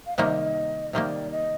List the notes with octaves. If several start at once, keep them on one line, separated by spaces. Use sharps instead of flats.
F5
C3 D#3 G3 A#3 D#5
C3 D#3 G3 A#3 D5
D#5